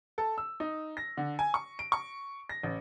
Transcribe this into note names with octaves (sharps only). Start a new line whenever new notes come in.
A4
E6
D#4
A#6
D3
G#5
C#6
D7
C#6
A#6
A1